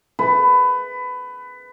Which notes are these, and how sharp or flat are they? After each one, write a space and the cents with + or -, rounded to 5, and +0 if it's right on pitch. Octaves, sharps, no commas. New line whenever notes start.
B4 +20